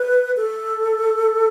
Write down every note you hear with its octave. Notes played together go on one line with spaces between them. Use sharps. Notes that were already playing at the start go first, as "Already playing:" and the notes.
Already playing: B4
A4